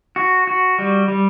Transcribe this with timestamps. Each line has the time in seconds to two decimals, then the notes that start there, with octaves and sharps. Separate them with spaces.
0.16 F#4
0.47 F#4
0.79 G3
1.08 G3